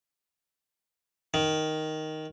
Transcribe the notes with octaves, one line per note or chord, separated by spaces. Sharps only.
D#3